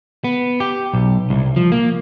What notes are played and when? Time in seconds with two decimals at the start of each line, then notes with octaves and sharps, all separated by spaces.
0.24 B3
0.60 G4
0.93 B1
1.30 C2
1.56 F3
1.72 A#3